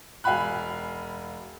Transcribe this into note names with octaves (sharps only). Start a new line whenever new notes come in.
E1 F5 G#5 B5 F#6